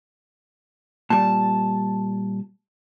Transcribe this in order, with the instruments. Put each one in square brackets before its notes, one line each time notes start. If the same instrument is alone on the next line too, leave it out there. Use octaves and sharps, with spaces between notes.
[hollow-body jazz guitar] A#2 G3 [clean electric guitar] A5